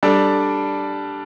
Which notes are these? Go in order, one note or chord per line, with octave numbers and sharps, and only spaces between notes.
G3 D4 A4